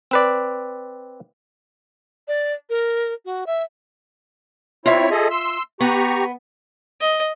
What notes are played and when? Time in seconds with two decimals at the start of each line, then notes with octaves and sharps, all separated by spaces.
0.11 C4 B4 D5
2.28 D5
2.70 A#4
3.25 F#4
3.47 E5
4.86 C4 E4 F4 C#5 E5
5.11 G#4 A4 D#5
5.31 C6 E6
5.81 B3 G4 A#5 C#6
7.01 D#5